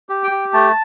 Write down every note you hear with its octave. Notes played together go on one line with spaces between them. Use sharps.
G4
G5
G4
A3 A5